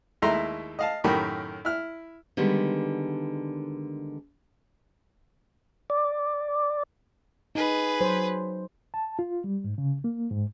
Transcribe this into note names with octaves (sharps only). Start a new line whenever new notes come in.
D#2 G#3 A3 E4 A#5 C6
D#5 F5 A5
F#2 A2 D#3 G4 A#4 B5
E4 F6
D3 D#3 G3 G#3 B3
D5
D#4 G#4 B4
F#3 C5
A5
F4
G3
G#2
C#3
A#3
G#2